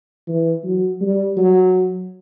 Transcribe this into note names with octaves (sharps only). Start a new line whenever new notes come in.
E3
F#3
G3
F#3